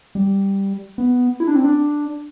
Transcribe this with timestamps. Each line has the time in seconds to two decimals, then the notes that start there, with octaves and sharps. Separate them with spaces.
0.15 G3
0.98 B3
1.40 E4
1.47 D4
1.55 C4
1.64 D4